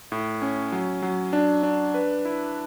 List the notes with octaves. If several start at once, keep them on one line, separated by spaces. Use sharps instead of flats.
A2
C#4
F#3
F#3
D4
D4
B4
E4